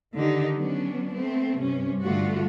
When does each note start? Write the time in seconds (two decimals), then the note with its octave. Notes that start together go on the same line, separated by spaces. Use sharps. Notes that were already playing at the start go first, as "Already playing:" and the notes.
0.15 D3 D#3 D#4 G4
0.56 F#3 B3 C#4 D4
1.14 A3 B3 C4
1.60 G2 C3 C#4
2.02 G2 D3 A3 F4 F#4